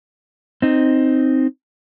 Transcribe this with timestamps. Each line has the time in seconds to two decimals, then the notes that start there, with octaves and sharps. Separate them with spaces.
0.62 C4 D#4